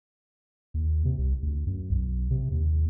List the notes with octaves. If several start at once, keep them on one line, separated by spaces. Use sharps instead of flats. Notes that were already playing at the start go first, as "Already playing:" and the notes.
D#2
C3
C2
D2
F#2
B1
C3
D#2